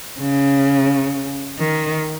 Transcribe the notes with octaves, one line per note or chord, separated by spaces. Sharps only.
C#3
D#3